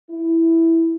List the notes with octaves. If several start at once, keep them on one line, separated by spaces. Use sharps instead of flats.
E4